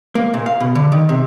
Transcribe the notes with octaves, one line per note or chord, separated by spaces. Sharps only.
A#3
A#2
F5
B2
D3
D#3
C3